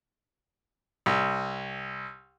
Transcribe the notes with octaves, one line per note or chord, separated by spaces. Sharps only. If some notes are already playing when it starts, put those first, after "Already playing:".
C2